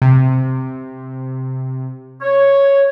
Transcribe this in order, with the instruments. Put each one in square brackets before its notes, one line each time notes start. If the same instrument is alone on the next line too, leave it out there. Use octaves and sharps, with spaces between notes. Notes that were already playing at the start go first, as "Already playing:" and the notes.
[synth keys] C3
[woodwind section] C#5